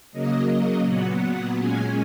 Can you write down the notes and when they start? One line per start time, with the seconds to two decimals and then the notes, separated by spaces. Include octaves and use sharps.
0.12 C#3 F#3 A#3 D#5
0.84 A#2 F#3 B3 F#5
1.57 A#2 G#3 C#4 G#5